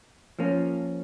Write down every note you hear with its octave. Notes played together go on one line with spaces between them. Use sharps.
F3 A#3 C#4